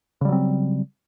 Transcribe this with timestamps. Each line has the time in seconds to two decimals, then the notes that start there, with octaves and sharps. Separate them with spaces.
0.21 C#3
0.25 G3
0.29 F#3
0.32 C4